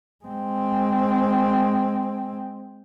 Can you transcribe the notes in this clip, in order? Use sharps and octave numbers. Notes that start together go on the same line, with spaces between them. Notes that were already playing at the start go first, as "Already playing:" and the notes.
G#3 C4